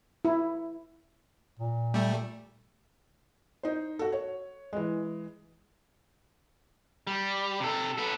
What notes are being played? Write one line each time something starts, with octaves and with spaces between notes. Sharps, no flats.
E4
A#2
G3 A3
D#4 C5
F#4 A4
C#5
E3 G#3
G3
C3 A4
B3 A4